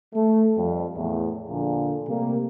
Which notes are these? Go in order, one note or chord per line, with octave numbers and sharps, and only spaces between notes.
A3
F2 G3
E2 A2
A#1 A#2 D3
C3 G3 A3 A#3